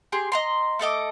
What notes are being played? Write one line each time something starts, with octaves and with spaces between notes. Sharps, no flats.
G4 G#4 C6
D#5 A#5 C6
A3 A4 D#5 D6